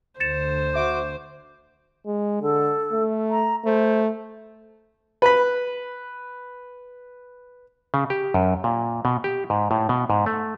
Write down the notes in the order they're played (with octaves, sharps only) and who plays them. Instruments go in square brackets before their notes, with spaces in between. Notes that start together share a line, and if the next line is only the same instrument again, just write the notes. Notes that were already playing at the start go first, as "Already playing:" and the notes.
[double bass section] D2 D3 [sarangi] C5 [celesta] A6 C#7 E7
[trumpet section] F#4 D6 [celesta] E5
[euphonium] G#3
[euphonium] D3 [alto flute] A4
[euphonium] A3
[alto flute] A#5
[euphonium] A3 [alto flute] C5
[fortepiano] B4 B5
[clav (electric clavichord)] C#3
G4
F#2
A#2
B2
G4
G#2
A2
B2
G#2
A3